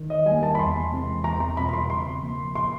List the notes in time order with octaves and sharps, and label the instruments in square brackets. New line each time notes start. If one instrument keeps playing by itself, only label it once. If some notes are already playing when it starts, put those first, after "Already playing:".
Already playing: [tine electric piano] D#3
[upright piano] D#5
[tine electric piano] G3 A#3 [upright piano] G#5
[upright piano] A5
B5
[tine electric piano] E2 [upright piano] C6
[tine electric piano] C3 E3 G#3 C4
[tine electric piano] E2 [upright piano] A#5
[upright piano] A#5
[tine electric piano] B2 G3 C4 F4 [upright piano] B5
[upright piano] B5
C6
[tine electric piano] C#3 [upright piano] C6
[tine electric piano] F3 A#3
[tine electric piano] A#2 [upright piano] C6